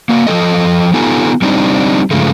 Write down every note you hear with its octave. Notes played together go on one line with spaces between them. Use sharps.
A#3 F#4
F3 G3 A4 D#5
B3 D#4 F4 G4 A4 G#5
G3 C4 D4 D#4
G2 C#3 F3 G#3 A3